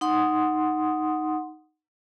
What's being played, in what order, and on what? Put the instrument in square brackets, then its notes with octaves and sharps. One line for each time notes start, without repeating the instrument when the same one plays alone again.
[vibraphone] D#4 F#5 C6 D#6